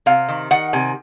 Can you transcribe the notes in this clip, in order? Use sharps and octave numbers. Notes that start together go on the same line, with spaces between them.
C3 F5
D#3
D#3 F#5
C3 G#5